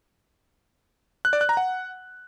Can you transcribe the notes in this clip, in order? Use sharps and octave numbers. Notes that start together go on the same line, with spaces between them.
F#6
D5
F#6
A#5
F#5